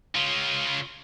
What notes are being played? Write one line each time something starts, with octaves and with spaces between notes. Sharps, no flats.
C#3 F4